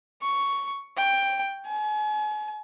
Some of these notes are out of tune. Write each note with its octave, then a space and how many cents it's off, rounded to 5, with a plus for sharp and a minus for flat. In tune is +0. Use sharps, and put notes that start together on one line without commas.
C#6 +5
G5 +10
G#5 +40